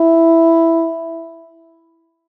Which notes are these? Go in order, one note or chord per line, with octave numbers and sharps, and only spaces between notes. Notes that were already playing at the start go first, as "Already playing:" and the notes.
Already playing: E4